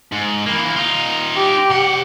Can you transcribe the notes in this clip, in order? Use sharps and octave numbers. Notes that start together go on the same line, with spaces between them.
G#2
E3 A#3
D#4 F4
G4
C3 F#5